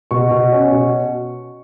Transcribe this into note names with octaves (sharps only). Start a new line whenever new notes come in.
B2 C#6
B2
C#4
B2